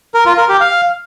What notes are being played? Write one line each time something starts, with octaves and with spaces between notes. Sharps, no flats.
A#4
F4
A#4
G4
F5